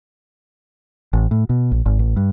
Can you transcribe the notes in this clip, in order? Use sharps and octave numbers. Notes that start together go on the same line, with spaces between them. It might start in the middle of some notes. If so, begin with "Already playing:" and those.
A1
A2
B2
A#1
G#1
A1
G2